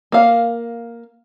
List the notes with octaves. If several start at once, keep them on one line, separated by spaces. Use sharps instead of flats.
A#3 F5